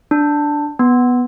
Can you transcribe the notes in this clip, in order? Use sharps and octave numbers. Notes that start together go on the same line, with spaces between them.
D4
B3